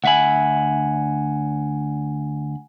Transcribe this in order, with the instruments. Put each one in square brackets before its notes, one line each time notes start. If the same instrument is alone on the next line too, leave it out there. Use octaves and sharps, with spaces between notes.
[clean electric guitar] D2 E5 B5 [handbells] F#5 G#5